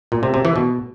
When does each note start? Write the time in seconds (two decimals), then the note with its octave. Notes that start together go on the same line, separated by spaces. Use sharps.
0.12 A#2
0.23 C3
0.34 C3
0.45 E3
0.56 B2